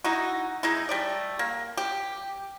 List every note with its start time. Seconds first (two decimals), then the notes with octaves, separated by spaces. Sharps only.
0.04 D#4 E4 F#4
0.63 G#3 D#4 E4
0.89 G3 A3 D5
1.39 A#3
1.77 G4